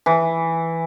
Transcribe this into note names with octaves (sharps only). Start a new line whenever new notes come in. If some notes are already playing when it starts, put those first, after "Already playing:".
E3